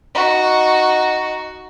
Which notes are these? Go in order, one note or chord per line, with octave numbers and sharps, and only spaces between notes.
D#4 F#4